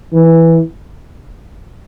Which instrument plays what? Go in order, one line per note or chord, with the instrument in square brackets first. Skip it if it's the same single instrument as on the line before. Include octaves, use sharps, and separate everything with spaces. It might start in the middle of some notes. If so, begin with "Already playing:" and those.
[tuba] E3